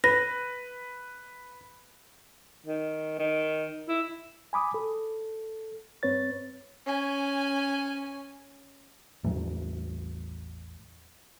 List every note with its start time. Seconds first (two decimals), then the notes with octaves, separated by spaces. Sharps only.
0.04 B4 A#6
2.66 D#3
3.19 D#3
3.88 E4
4.53 G#5 B5 D6 D#6
4.74 A4
6.03 G2 C4 B4 C#5 A6
6.86 C#4 G#5
9.24 A1 E2 A2 F#3